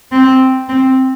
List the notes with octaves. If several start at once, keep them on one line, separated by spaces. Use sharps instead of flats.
C4
C4